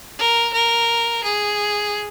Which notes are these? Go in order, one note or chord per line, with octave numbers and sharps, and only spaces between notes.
A#4
A#4
G#4